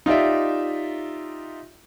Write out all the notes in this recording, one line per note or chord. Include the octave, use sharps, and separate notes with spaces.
D#4 F4 G4 D5 E5